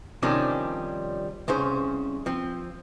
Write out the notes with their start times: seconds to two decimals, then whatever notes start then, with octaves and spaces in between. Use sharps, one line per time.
0.23 C3 D#3 F3 G3 C#4 D4
1.48 C2 C#3 C#4 C5
2.26 F3 C4